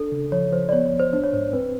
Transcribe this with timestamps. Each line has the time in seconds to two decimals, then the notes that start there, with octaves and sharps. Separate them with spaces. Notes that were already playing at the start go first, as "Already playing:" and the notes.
Already playing: D4 A4
0.12 C#3
0.32 F3 C#5
0.52 F3 C5
0.69 D5
0.72 B3 C#5
0.86 C#5
0.93 D2
0.99 C5
1.13 D4 C5
1.24 C#5
1.33 G#2 C5
1.53 C4 B4